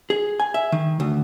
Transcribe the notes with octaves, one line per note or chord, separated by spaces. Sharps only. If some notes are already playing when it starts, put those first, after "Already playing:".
G#4
G#5
E5
D#3
D2